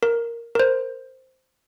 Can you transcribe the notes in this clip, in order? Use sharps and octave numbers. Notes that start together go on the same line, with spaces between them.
A#4
A#4
C5